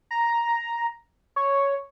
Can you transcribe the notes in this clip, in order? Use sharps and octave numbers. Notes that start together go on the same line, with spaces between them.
A#5
C#5